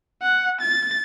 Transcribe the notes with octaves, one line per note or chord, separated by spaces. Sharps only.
F#5
A6